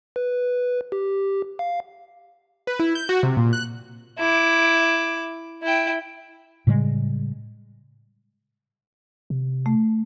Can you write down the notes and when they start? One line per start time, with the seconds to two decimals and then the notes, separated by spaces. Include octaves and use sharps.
0.16 B4
0.92 G4
1.59 F5
2.67 B4
2.79 E4
2.95 G6
3.09 F#4
3.23 C3
3.37 A#2
3.53 F#6
4.19 E4 D6
5.63 E4 G5
6.67 A2 C#3 G3 G#3
9.30 C3
9.66 A3